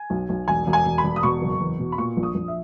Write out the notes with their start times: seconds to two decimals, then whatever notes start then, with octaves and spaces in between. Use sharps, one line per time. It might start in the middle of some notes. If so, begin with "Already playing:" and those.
Already playing: G#5
0.10 B1
0.29 B1
0.48 E1 G#5
0.67 E1
0.73 G#5
0.85 E1
0.98 B5
1.04 E1
1.16 D#6
1.23 B2 C#6
1.42 F#1
1.60 E2
1.79 B2
1.92 B5
1.98 A#2 C#6
2.17 A#1
2.23 D#6
2.35 A#1
2.48 E5